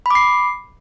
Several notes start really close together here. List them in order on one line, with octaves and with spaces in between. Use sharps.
B5 D6 C7